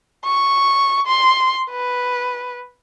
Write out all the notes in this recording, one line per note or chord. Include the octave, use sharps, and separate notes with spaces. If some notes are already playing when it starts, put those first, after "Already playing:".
C#6
C6
B4